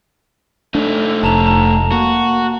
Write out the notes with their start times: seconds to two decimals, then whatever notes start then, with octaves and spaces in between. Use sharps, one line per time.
0.75 A3 D4 D#4
1.23 F1 A5 A#5 F7
1.47 A#5
1.92 A#3 F#4